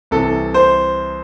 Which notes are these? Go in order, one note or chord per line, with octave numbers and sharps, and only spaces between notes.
C2 C3 E3 A4
C5